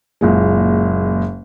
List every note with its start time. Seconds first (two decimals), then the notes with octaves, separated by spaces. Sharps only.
0.21 F#1 A#2 G#3